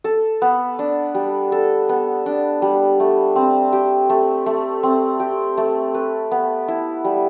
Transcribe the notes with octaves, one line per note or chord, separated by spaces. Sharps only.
A4
B3
D4
G3
A4
B3
D4
G3
A3
C4
G4
A3
A3
C4
G4
A3
B4
B3
E4
G3